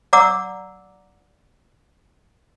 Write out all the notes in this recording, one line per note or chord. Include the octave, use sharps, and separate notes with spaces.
D5 F#5 A#5 D6 E6